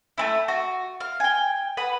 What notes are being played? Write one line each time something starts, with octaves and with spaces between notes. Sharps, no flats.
A3 C4 E4
F#4
F5
G5 G#5
B4 F#5 D#6